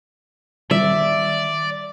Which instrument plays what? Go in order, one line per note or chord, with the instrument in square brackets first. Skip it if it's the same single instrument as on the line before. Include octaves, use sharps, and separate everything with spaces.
[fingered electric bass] D#3 G3 [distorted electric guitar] D5 [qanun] E5